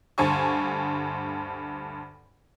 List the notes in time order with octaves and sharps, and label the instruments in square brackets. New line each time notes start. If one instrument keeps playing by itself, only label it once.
[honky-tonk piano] D2 G2 C5 G#5 A5 C#6